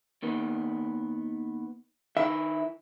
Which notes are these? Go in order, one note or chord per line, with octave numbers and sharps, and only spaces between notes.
D#2 D#3 B3
D#3 E4 E5